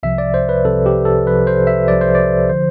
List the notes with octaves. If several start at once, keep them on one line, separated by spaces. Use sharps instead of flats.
C2 C3 F3 E5
D5
C5
B4
C2 C3 F3 A4
G4
A4
C2 C3 F3 B4
C5
E5
C2 C3 F3 D5
C5
D5
D3 F3 C5